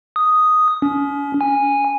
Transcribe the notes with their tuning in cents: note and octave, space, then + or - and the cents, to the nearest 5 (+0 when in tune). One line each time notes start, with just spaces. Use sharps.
D#6 +0
C#4 +35
G#5 -10